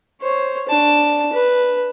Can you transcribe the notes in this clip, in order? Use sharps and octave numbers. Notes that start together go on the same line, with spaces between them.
C5 C#5
D4 A5
B4